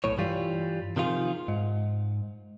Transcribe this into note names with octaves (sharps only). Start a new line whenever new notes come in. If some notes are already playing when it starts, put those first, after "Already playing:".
B1 A2 C#5
G2 E3 G3 F4
C3 D#3 F3 F4 G#4
G#2